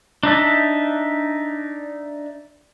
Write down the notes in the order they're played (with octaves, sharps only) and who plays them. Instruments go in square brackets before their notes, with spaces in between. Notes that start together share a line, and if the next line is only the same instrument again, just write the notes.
[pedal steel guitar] D4 D#4 E5 A5